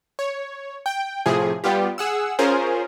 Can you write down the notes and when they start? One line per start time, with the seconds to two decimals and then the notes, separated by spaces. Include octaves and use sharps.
0.19 C#5
0.86 G5
1.26 A2 C3 F3 G#4
1.64 G3 B3 F4 G4
1.98 G#4 F#5 E6
2.39 C#4 F4 G#4 A#4 C5